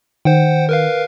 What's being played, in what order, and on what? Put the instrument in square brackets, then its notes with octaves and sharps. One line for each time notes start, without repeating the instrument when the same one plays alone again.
[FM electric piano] D#3 [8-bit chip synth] C5 F#5 G5
[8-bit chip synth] A#4 B4 F5